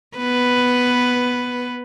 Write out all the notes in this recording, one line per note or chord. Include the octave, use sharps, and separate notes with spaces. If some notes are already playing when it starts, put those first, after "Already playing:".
B3 B4